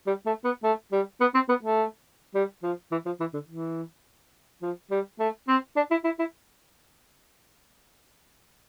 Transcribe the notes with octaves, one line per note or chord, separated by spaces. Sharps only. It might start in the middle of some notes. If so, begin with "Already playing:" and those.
G3
A3
B3
A3
G3
B3
C4
B3
A3
G3
F3
E3
F3
E3
D3
E3
F3
G3
A3
C4
D4
E4
E4
E4